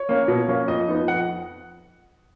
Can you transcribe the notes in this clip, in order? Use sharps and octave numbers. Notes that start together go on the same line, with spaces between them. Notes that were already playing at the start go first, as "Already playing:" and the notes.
Already playing: C#5
A#3 C#4
B2
A#3 C#4
F2 D#5
F3 B3 D#4
F2 F#5